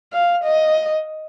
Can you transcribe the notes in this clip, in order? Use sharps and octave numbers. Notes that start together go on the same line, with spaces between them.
F5
D#5